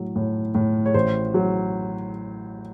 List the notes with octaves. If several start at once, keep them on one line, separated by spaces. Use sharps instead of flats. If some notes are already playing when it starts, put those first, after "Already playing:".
Already playing: A2 F#3
A2
A2
C#5
A1 C5
F#3